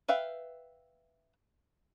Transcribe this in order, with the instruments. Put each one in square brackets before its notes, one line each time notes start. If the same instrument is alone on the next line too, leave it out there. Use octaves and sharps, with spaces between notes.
[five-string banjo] B4 E5 F5 G5